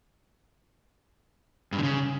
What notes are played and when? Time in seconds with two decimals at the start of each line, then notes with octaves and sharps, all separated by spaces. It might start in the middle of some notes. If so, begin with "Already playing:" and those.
1.72 G2
1.78 D3
1.83 C#3